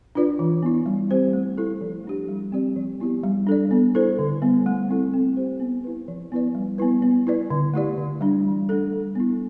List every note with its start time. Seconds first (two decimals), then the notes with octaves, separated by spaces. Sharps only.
0.15 D4 F4 B4 D5
0.39 E3
0.63 B3 E4
0.86 G3
1.11 C4 G4 C5
1.33 A3
1.57 E4 A4
1.81 F3
2.04 A3 D4 G4
2.28 G3
2.52 C4 G4 D5
2.76 F3
3.00 B3 E4 G4
3.23 G3
3.47 D4 A4 D5
3.71 B3
3.95 E4 A4 C5
4.19 D3
4.42 G3 B3
4.66 A3
4.89 C4 E4 A4
5.14 C4
5.37 G4 C5
5.60 B3
5.84 E4 B4
6.08 F3
6.32 B3 E4 B4 D5
6.55 G3
6.78 B3 E4 B4
7.02 B3
7.27 E4 B4 D5
7.50 D3
7.74 A3 E4 G4 D5
7.98 D3
8.21 G3 D4
8.45 E3
8.69 A3 D4 A4
8.93 G3
9.15 B3 E4